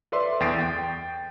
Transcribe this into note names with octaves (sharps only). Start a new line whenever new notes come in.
A4 B4 D5 E5 C6
E2 G5 D#6 A6 C7 D7
G5